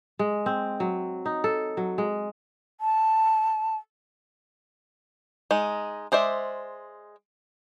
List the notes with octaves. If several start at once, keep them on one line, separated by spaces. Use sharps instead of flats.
G#3
C4
F#3
D#4
A4
F#3
G#3
A5
G#3 D#4
G#3 C5 D5 E5